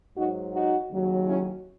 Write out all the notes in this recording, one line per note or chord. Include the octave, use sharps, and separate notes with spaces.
G#2 F#3 D#4 F#4
D#4 F#4
D#2 C#3 F#3
C#4 E4